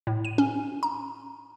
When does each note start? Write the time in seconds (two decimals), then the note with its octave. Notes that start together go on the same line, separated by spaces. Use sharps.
0.07 A2
0.25 D#7
0.38 C#4
0.83 A#5